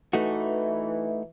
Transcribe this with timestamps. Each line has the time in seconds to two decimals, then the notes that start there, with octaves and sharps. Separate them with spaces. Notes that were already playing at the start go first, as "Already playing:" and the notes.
0.13 E3 A3 D#4 F#4